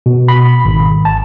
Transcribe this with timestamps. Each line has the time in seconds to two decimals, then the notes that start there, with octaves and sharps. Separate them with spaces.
0.06 B2
0.28 B5
0.65 G#1
1.05 A5